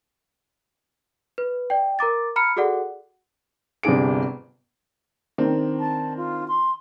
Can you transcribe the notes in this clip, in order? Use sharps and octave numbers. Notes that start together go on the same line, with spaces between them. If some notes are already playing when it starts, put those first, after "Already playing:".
B4
D5 G5
A#4 A#5 D6 A6
A#5 B5 F6 C#7
F#4 G#4 A4 D5 F#5
G1 C3 D4 G#4 D7
D#3 C4 D4
A5
F4
C6